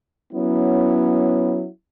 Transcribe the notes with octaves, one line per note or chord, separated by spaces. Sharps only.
F#3 B3 C#4 E4